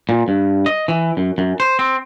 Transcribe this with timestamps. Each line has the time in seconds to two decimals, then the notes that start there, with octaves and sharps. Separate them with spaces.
0.09 A#2
0.28 G2
0.66 D#5
0.88 E3
1.17 F#2
1.38 F#2
1.60 C5
1.79 C4